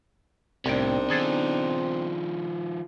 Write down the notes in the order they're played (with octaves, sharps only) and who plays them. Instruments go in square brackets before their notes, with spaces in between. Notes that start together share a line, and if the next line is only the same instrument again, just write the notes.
[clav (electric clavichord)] C2 G5 [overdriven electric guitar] A2 C3 [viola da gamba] B3 D4 D#4 [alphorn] C4
[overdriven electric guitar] D#3 F3 [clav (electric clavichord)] G#4 A4